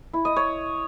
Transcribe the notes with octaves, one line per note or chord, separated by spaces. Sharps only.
E4
D#5
C#5